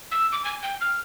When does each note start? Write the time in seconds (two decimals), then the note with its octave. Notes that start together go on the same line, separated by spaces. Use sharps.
0.11 E6
0.32 D6
0.45 G#5
0.63 G5
0.81 F6